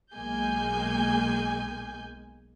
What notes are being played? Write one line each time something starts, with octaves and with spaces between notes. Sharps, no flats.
B1 G#3 A#3 G#5 G6